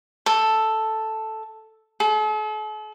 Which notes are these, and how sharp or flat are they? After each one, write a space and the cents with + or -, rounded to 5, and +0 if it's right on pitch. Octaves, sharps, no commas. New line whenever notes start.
A4 +0
A4 -45